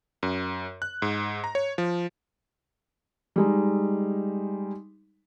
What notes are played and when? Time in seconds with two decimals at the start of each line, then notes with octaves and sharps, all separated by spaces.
0.23 F#2
0.82 F#6
1.02 G#2
1.44 A#5
1.55 C#5
1.78 F3
3.36 G3 G#3 D#4